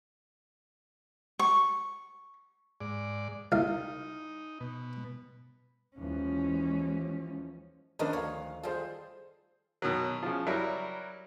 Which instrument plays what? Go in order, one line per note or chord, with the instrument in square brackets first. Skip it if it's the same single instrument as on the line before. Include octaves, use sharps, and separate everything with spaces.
[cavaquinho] C#6
[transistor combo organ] G#2 D5
[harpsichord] C2 F5 [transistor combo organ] D#4
[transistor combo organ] B2
[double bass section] D#2 E3 F3 [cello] G#3 C#4
[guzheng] D#3 F3 D#4 [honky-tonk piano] D4 A#4 B4
[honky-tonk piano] D2 F5 [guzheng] C#5
[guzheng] G3 A4 [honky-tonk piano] F4 G#4 C5
[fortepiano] B2 D#3 F#3
C#3 F3
F#3 G3 E4 A#4